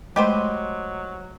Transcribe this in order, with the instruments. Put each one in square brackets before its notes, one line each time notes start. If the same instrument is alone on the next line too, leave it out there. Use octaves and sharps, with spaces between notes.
[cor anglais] F#3 [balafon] G#3 A3 [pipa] G4 B4 C5 [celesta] D#5 D6